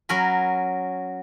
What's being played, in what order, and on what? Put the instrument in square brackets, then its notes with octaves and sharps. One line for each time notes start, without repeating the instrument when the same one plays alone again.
[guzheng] F#3 C#4 A#4 G#5 B5